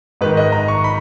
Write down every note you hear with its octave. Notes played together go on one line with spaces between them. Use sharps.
G#2 D#3 B4
D#5
A#5
C#6
B5